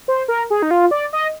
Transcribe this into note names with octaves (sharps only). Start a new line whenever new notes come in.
C5
A#4
G#4
D#4
F4
D5
D#5